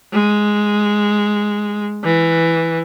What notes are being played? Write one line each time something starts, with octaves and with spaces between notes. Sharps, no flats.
G#3
E3